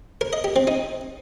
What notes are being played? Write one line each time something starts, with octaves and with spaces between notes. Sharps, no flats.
A#4
D#5
G4
C4
D#4